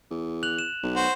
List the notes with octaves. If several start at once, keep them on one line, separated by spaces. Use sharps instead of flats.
E2
F#6 F7 F#7
E7
B1
F#4 C5